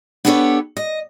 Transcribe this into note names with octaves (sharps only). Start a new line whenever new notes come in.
B3 D4 G4 A4 B4 C#5
D#5